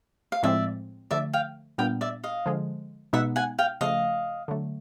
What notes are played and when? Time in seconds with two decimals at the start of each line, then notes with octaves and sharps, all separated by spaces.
0.32 F5
0.43 A2 F3 G#3 C4 D5 E5
1.11 D3 F3 A3 D5 E5
1.33 F5 G5
1.78 A#2 G3 B3 D4 F5 G5
2.01 D5 E5
2.24 D#5 F5
2.46 D3 F3 G#3
3.13 B2 G#3 B3 D#4 E5 F#5
3.36 F#5 G#5
3.58 F5 G5
3.81 C#3 F3 A3 D#5 F5
4.48 D3 F#3 A3